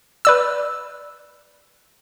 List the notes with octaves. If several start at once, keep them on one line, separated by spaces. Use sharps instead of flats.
B4 D5 E6